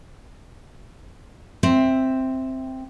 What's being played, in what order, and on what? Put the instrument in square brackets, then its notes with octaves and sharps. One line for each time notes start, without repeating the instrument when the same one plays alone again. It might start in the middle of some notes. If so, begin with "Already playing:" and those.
[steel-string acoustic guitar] C4 E5